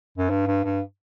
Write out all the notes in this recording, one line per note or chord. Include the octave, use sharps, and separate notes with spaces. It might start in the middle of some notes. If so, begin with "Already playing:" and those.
F#2
G2
G2
G2